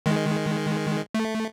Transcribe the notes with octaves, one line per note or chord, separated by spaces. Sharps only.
D#3 G#3
A3